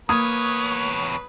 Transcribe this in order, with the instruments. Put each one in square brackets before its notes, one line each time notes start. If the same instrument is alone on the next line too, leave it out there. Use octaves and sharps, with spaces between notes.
[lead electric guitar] E2 C#5 [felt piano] A#3 G#6 [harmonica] B4 [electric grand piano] D#6